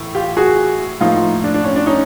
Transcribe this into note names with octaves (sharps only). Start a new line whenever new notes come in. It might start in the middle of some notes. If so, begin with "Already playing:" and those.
Already playing: A2 E3 A3
F4 G4
F#4 G#4
A2 F3 A#3 D#4 F4
D4
D4
C#4
D4
C#4 D#4